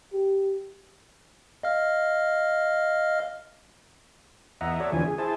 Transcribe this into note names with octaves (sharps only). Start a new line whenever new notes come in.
G4
D#5 F5 F6
E2 D#5 E5 F#5 A#5
F#4 A4 C#5 D5 E5
E2 D3 E3 F3 G3 G#5
G#4
E4 G#4 C5 A5